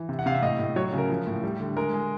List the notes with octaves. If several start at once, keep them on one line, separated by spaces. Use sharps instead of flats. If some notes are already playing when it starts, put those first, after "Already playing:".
Already playing: E3
C3
F#5
C3 F5
E5
A2 D#5
A2
F#3 C#5
C#3
A#4
F3
A2
G3
D3
G#3 A#4
G#3